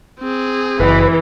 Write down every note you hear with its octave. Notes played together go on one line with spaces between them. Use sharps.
C4 G#4
F#1 E3 B4